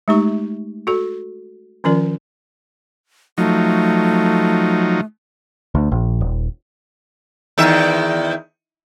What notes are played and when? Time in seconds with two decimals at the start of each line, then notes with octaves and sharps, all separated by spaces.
0.08 G#3 A3 D#4 G4 C#6
0.87 F#4 A4
1.84 D#3 F3 C#4 F4 A#4 D5
3.38 F3 F#3 A3 D#4
5.75 D2
5.92 A#1
6.21 D#1
7.58 E2 D#3 E5